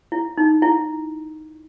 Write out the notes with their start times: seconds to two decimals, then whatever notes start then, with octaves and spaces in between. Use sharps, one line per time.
0.12 E4
0.37 D#4
0.62 E4